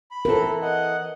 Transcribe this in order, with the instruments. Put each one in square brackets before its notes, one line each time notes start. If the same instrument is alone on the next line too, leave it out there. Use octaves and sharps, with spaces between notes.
[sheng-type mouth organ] B5
[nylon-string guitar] E3 C4 A4 [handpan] A#4
[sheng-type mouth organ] D#5 F#5